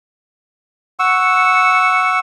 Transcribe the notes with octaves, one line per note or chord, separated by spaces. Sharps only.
F#5 C#6 E6